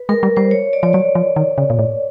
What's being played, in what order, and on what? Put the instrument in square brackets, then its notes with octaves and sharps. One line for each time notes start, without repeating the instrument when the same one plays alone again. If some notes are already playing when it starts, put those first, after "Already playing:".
Already playing: [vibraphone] B4
[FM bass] G#3 [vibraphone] A#4
[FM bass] G3
[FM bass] G3 [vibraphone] C5
[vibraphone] C#5
D5
[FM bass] F3 [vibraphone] C#5
[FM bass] F#3 [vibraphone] D5
[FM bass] F3
D#3
C#3
A#2
A2